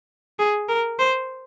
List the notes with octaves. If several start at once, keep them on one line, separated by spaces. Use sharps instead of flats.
G#4
A#4
C5